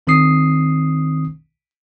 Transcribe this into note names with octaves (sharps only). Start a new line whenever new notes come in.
A#1 D#3 C4 D4 D#6 C7